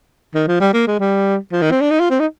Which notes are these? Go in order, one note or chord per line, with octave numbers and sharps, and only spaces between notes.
D#3
F3
G3
A#3
G#3
G3
F3
D#3
C4
D4
D#4
F4
C4
D#4